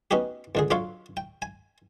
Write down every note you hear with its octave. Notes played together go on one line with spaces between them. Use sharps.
B3 C#4 D#4 F#4 G4
C#2 D3 G#4
F#3 D4 F4 A4 C#5 F5
G5
G#5